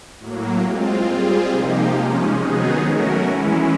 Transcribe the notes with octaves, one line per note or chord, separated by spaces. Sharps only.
A2 F#3 A#3
G#3 C4 F4
G3 C4 F4 G#4
C3 F3 A#3 D#4 G4
C3 F3 G#3 C#4
D#3 F#3 B3 D#4 G#4
A3 C#4 F#4 A#4
E3 G#3 C#4 E4